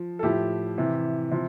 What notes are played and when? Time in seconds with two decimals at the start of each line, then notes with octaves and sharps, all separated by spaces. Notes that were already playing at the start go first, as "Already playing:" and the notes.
Already playing: F3
0.19 A4
0.23 A2 F3 E4 G4
0.78 C3 E3
1.31 C3 F3